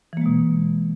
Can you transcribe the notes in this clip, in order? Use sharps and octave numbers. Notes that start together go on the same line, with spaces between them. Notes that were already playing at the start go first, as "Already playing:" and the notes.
B2 E3 G#3 A#3